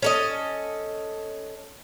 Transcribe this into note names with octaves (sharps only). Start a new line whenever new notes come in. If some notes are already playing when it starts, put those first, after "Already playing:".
C#4 A4 D#5